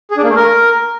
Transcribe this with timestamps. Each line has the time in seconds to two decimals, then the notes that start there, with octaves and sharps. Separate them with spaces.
0.11 G#4
0.17 D4
0.23 A#3
0.30 A3
0.36 A#4